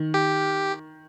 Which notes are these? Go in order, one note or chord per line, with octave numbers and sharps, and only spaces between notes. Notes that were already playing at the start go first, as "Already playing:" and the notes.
Already playing: D#3
G4